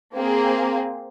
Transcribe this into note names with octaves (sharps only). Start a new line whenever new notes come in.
A#3 C4 G#4